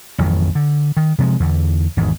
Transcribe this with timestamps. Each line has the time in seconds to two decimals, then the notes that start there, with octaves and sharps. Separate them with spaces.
0.18 A1 F2 D#3 F#3
0.55 D3
0.97 D#3
1.18 C3 F3 F#3 G#3
1.40 E2 D3
1.97 G#1 E2 G#2